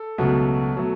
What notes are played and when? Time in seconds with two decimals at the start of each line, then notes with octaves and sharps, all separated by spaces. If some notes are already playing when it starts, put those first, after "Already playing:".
Already playing: A4
0.18 C#2 B2 F#3 A3
0.75 B2 F#3 A3